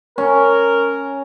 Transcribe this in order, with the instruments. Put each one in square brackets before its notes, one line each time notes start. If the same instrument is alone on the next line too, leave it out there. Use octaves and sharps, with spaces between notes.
[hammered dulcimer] C#4 [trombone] A#4